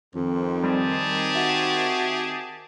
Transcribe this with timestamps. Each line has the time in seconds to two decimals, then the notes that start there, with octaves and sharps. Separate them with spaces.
0.15 F2 D#3 C4
0.64 G3 G4 G#4 A5
1.35 F#4 E5